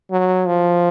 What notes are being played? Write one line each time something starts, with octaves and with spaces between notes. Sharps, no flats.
F#3
F3